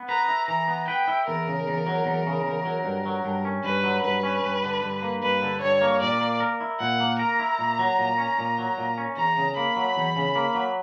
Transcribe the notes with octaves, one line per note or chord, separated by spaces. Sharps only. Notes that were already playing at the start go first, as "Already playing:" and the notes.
Already playing: B3
B4 A#5
E4
E3 A#5
B3
B4 G5
E4
E2 A#4
C#3
E2
F#3
E2
C#3
E2
F#3
G2
F#3
G2
C#4
G2 B4
F#3
G2 B4
C#4
G2
D3
G2
A#3
G2 B4
D3
G2 C#5
A#3
A#2 D5
A#3
A#4
E4
A#2 F#5
A#3
A#4 A#5
E4
A#2
F#3
A#2
C#4
A#2
F#3
A#2
C#4
E2 A#5
C#3
A#3 B5
F#3
E2
C#3
A#3
F#3